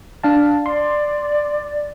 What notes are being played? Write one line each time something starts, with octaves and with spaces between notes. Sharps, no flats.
D4 F5 A5
D5 C6